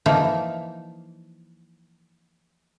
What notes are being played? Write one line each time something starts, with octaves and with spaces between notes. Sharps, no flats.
E3 F3 A#3 D#4